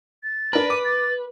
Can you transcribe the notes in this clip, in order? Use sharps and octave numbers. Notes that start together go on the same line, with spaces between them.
A6
D4 A#4 B4
D6 D#7
A6